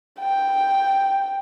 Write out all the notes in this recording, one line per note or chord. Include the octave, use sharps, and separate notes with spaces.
G5